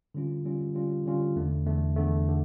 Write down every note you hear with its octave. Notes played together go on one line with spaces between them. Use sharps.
D3 G3 C#4 F4
D3 G3 C#4 F4
D3 G3 C#4 F4
D3 G3 C#4 F4
E2 D3 A3
E2 D3 A3
E2 D3 A3
D3